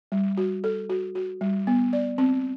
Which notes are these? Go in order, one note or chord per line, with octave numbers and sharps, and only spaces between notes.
G3
F#4
A4
F#4
F#4
G3
B3
D5
C4